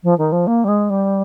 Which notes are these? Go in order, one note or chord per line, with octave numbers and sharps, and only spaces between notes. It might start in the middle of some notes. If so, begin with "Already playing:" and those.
F3
D#3
F3
A#3
G3
G#3
G3